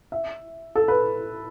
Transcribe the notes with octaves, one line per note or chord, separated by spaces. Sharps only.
E5
A4
B4